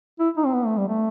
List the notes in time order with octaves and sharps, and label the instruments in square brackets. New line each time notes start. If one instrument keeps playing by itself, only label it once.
[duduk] E4
D#4
C4
B3
A3
G3
A3